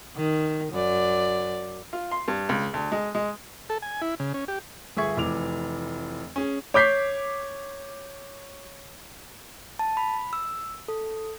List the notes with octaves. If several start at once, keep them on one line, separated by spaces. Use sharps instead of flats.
D#3
F#2 D5
F4
C6
G2
C#2
D2
G#3
G#3
A4
G#5
E4
C#3
C#4
G4
G1 G#4 E5 C#6 G#6
F1 E3 D6 F7
C#4 G#4
C#5 D6 G6 B6 C7
A5
B5
E6
A4